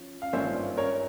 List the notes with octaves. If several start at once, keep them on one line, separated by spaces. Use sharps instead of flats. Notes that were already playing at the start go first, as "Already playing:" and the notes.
Already playing: F3 C#4
F5
G#1 G2 F3 A#3 C#4 C5 E5
A#4 C#5